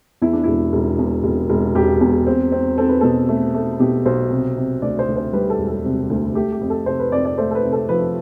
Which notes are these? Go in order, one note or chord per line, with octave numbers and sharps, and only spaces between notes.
E2 E4
D4
E1 E4
E1
E2
E1
E1
E1 G4
E2
C4
C4
C4 A4
B4
B2 A4
A3
A3
B2 G4
B1 C5
C3
C3
D2 D5
C5
D2
C5
G3 B4
A4
E1
A4
C3
D2
A3 G4
G4
F2
A4
C3 C5
B4
F2 D5
D5
A3 C5
A4
B4
C3
A4
F3 B4